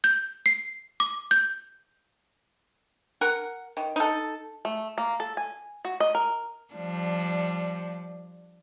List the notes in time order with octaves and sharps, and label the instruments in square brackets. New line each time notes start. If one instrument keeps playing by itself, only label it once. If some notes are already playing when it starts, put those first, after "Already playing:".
[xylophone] G6
C7
D6
G6
[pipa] A#4 F#5
D#3
D#4 A4
[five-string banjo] A3
A#3
A4
G#5
F#4
D#5
A#4
[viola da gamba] F3 G3 D4